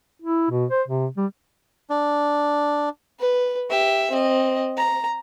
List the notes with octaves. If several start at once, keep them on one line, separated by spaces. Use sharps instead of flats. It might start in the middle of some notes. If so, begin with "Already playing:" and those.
E4
B2
C5
C3
G3
D4
B4
G4 E5
C4 D#5
A#5